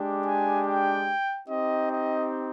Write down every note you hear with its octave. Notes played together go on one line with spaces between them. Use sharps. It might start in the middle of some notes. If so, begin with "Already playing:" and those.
Already playing: G#3 D4 G4
G#5
G5
C4 D#4 G4 D#5
D#5